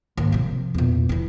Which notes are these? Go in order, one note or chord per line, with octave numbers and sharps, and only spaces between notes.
D#2 G#2
C3 F3
E2 A#2
E3 E4